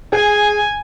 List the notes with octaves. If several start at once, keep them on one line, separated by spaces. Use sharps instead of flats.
G#4 G#5